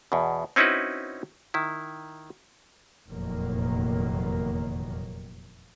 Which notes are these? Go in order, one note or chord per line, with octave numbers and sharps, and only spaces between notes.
E2 B2
C4 C#4 D#4 E4 F#4 B4
D#3 E4
F1 E2 A#2 D#3 F#3 A#3